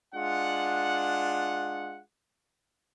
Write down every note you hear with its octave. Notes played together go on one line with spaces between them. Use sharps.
G#3 D4 F4 F#5